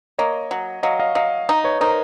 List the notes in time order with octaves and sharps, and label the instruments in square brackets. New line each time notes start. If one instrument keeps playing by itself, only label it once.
[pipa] A#3 [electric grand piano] C#5 D#5
[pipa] F#3
[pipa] F#3 [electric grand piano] D#5 F5
[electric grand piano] D#5 F5
[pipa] F#3 [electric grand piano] D#5 F5
[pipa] D#4
[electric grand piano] B4 C#5
[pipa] D#4 [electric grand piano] A#4 C5